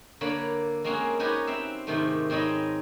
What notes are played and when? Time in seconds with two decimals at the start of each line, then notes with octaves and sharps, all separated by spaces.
0.21 D3 A#3 C#5 D5 B5
0.84 G#3 A#3 C4 C#4 F#4 G#4
1.19 D#4 F#4 G4 B4 C#5 G#5
1.47 C4 C5 E5
1.87 G#2 C3 D#3 A3
2.30 G#2 C4 D#4 C#5 D#5 B5